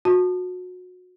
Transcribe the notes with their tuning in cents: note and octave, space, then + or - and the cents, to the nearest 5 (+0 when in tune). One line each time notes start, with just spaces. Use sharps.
F#4 -25 A5 +0